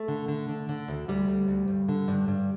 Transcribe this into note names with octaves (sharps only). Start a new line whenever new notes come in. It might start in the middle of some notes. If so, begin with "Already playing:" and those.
Already playing: A3
D3
D3
D3
D3
D2
D2 G3
D2
D2
G2
D3
G2
G2